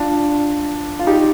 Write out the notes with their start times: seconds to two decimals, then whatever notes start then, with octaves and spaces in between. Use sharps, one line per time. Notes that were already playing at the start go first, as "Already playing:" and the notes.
Already playing: D4 F4
0.99 F4
1.07 D#4 G4